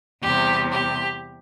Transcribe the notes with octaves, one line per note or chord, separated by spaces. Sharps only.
E2 C3 G3 G4
G4